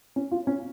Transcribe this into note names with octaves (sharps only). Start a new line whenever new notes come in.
C#4
F4
C#4